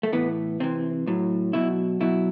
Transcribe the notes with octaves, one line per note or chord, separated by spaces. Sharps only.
A3
A2 E3 B3
C3 E3 C4
A2 F#3
B2 F#3 E4
B2 F#3 E4